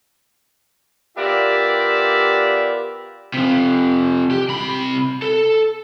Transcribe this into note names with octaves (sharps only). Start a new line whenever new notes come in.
B3 F4 G4 A#4 D5 E5
C3 F3
G4
C3 B5
A4